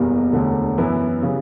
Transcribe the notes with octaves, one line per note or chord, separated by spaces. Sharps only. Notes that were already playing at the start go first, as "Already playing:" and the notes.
Already playing: F#1 E2 B2 G3 A#3
E1 D2 D3
F#2 E3 B3 E4
C#3 E3 G3